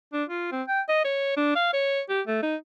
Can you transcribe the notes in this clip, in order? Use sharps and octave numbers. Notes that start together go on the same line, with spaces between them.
D4
F4
C4
G5
D#5
C#5
D4
F5
C#5
G4
A3
D#4